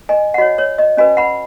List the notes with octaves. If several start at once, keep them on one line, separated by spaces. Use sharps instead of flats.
D#5 G#5
F#5
F#4 C#5 D#5
C#5
D#5
C#4 F#4 B4 D#5 G#5
F#5 B5